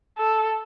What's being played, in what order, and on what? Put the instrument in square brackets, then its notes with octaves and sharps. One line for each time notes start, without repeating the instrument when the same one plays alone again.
[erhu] A4